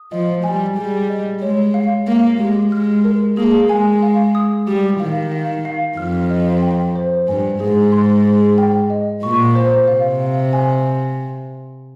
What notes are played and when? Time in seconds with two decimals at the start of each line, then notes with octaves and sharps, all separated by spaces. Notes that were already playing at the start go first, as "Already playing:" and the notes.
Already playing: D#6
0.12 F3 D#5
0.44 G3 G#5
0.77 G3 G#4
1.09 D#5
1.41 G#3 C#5
1.74 F5
2.07 A#3 F5
2.40 G#3 G4
2.72 G#3 F6
3.04 A#4
3.37 A#3 G#4
3.69 G#3 G#5
4.03 F5
4.35 D#6
4.67 G3 G4
5.00 D#3 F5
5.32 F5
5.65 F5
5.97 F2 F6
6.30 D#5
6.62 G5
6.96 C5
7.28 G2 G#5
7.60 G#2 G#4
7.92 C6
8.25 G#4
8.58 G5
8.90 D#5
9.23 A#2 C#6
9.55 C5
9.88 C3 F5
10.20 F5
10.53 G#5